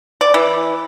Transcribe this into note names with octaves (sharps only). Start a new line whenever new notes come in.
D5
E3